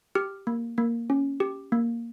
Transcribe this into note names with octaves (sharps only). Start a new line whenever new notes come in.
G4 F6
A#3
A#3
C#4
G4
A#3